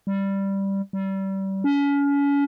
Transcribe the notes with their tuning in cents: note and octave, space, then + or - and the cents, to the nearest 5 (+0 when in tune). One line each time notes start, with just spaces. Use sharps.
G3 +0
G3 -25
C#4 +35